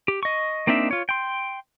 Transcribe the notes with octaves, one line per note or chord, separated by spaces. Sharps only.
G4
D#5 C#6
A#3 C4 D4 D#4 E5
F4 C#5
G5 C6